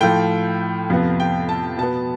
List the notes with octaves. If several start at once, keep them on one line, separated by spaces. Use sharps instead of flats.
A2 F3 A3 G5
F2 C3 F3 B3
G5
A5
B2 B3 A5